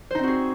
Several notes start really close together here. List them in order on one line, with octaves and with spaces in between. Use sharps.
C5 D#4 C4 F#4 G#4